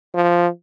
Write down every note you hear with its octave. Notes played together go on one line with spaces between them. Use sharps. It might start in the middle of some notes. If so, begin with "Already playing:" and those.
F3